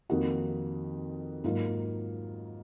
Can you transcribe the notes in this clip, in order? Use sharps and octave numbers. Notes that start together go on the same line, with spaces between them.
F2 D#3 A#3 D#4 F#4
G#2 F#3 A#3 F4